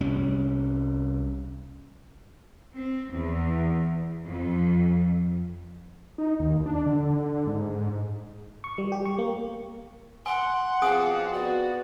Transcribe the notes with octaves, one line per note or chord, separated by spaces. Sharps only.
C2 G3 C#4
C4
E2
F2
D#4
D#2
D4
D3
G#2
C#6
G3
G4
C#6
A#3
F#5 G#5 C6
B2 F3 C4 G#4 F5 G#5 D#6
B3 F#4 D5